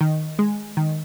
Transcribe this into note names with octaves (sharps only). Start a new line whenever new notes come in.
D#3
G#3
D#3